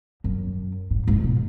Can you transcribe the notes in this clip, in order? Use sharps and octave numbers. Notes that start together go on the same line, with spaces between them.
F#2
G#2
G#2
B2